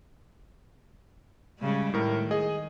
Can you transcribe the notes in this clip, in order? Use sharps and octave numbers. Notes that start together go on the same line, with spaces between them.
C#3 G3 G#3
A2 D#3 A#4
G#4 D#5